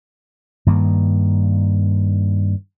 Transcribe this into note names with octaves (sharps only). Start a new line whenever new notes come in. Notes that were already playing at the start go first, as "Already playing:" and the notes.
G2 D#3 A#3